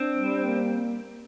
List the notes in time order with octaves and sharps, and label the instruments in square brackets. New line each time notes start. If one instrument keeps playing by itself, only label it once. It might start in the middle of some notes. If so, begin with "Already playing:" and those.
Already playing: [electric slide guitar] C4 [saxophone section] D4
[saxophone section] G3
A#3